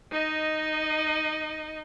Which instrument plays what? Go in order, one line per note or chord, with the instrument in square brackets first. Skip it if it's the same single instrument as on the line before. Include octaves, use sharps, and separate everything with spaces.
[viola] D#4 D#5